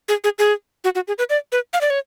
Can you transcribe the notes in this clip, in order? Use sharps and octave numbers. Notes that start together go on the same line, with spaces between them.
G#4
G#4
G#4
F#4
F#4
G#4
B4
D5
B4
F5
D5
C#5